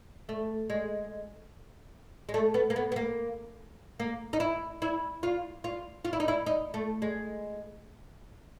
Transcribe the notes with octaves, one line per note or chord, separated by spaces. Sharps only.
A3
G#3
G#3
A3
B3
A#3
B3
B3
A#3
A#3
D#4
E4
E4
F4
F4
F4
E4
D#4
E4
D#4
A3
G#3